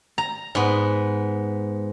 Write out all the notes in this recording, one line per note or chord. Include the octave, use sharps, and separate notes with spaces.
A#5
G#2 B3